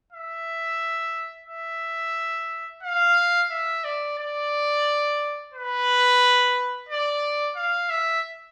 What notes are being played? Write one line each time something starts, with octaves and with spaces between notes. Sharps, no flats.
E5
E5
F5
E5
D5
D5
B4
D5
F5
E5